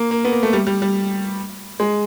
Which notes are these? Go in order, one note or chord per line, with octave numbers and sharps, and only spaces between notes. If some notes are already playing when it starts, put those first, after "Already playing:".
Already playing: A#3
A#3
B3
A#3
A3
G3
G3
G3
G#3